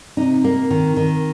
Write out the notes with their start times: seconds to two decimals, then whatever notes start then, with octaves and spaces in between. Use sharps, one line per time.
0.17 C3 D#4
0.44 A#3
0.71 D#3
0.97 D#3